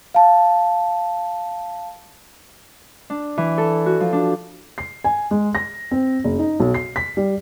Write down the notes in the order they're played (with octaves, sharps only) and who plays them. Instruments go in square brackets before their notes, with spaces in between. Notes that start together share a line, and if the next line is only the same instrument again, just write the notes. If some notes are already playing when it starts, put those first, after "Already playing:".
[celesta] F5 A5
[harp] D4
E3
A4
F#4
F3
D4
[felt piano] C7
G#5
G#3
A#6
C4
F#1
D#4
B1
C7
B6
G3